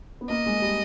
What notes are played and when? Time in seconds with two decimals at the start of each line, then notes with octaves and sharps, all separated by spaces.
0.21 B3
0.30 A#3 D#5
0.46 G#3
0.62 G3